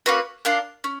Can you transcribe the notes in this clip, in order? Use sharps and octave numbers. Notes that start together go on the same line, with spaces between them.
A#3 C#4 F#4 B4
D4 F4 A#4
C#4